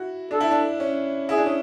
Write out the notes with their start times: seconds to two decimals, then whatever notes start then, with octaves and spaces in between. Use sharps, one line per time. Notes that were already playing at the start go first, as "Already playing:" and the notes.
Already playing: E4 F#4
0.31 D4 A4
0.40 E4
0.51 D4
0.80 C#4
1.29 E4 G#4
1.38 D4
1.46 C#4